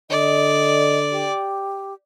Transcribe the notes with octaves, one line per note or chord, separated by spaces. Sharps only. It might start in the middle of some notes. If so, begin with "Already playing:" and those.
D3 D5 D#5
G4